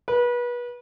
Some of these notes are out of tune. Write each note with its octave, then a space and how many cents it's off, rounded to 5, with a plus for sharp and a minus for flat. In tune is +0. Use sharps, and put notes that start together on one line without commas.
B4 -30